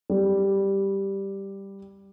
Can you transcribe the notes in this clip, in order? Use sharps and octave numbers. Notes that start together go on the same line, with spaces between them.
G3